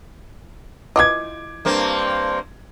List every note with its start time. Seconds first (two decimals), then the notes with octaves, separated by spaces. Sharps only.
0.96 E3 F4 D#5 D6 G#6
1.65 G2 A#3 C4